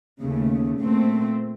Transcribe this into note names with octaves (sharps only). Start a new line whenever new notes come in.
D#2 C#3 A3
A#2 A3 C4